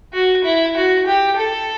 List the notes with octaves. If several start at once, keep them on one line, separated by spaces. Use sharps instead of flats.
F#4
E4
F#4
G4
A4